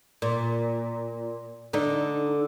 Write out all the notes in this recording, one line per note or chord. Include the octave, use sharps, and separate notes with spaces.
A#2
D3 D#4